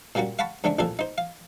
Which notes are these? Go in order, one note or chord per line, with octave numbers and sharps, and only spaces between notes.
A#2 G3 A#3 C#4 F#4
F5 F#5 A5 B5 C#6
G#2 D3 A3 C#4 D4
A1 F2 A#2 F3 A4 G#5
D#4 C5
F5